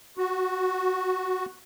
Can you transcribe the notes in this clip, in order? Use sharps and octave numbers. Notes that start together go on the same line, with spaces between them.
F#4